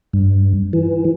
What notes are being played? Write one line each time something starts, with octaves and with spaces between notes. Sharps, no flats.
G2
E3